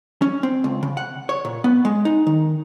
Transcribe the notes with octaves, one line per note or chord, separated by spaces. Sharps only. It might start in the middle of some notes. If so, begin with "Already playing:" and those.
C#4
C4
C#2
C#3
F#5
C#5
A#2
B3
G#3
D#4
D#3